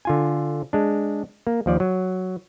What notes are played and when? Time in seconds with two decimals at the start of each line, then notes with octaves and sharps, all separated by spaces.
0.05 D3 F4 G#5
0.73 G#3 D4
1.47 A#3
1.66 D#2 F3 D5
1.80 F#3